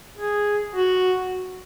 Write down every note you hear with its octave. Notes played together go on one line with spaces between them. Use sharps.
G#4
F#4